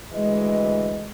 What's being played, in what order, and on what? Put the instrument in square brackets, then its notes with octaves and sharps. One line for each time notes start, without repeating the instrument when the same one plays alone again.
[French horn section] D2 E3 D#5 [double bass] G#3